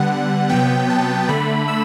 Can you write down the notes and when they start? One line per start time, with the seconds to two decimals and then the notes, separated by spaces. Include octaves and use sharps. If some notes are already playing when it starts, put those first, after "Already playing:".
Already playing: D3 G3 B3 F#5
0.49 C3 F#3 B3 G5
0.90 A5
1.29 D3 A3 B5
1.68 E6